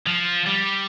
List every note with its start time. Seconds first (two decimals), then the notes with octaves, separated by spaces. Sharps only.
0.07 F3
0.47 G3